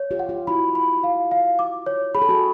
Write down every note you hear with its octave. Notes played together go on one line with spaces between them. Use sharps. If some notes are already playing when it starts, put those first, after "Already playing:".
Already playing: C#5
F4 G4
F#5
F4 G4
E4 F#4 B5
B5
F5
F5
D6
C#5
G#4 B5
A4
F#4 G#4